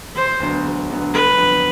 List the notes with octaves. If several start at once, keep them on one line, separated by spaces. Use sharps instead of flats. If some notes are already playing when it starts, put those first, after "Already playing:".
E1 C5
D2 D3 F#3 B3
E1
D2 D3 F#3 B3
G1 B4
F2 D3 F#3 B3